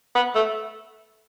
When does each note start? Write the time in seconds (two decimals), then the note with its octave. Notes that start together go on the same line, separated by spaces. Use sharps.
0.15 B3
0.35 A3